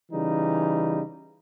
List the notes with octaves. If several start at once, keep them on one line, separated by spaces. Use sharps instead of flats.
C#3 E3 G3 D#4